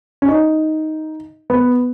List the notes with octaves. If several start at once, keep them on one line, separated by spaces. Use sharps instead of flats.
C#4
D#4
B3